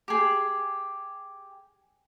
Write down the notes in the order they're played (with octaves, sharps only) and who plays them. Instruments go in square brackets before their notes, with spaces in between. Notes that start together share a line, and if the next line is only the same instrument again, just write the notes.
[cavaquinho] G4 G#4